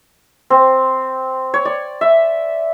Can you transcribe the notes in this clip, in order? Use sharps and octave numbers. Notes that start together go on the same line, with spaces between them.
C4
C#5
D5
E5